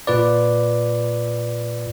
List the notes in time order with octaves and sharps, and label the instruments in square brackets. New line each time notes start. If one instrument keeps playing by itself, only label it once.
[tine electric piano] A#2 F4 B4 D5